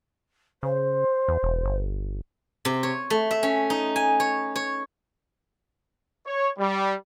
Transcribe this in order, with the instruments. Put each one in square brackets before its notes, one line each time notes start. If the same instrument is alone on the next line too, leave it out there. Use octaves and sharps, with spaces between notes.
[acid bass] C#3 [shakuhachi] C5
[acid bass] E2
E1
G1
[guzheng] C3
C#5
A3
E5
C#4
D#4
G#5
C#5
C#5
[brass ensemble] C#5
G3